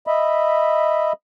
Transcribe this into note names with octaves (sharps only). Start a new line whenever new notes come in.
D#5 E5 B5